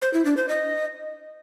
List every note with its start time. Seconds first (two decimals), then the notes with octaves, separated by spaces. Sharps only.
0.02 C5
0.14 E4
0.25 D4
0.37 C5
0.49 D#5